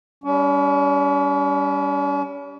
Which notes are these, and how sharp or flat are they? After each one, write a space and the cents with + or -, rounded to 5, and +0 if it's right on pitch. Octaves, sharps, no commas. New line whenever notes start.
G3 +0 C#4 +40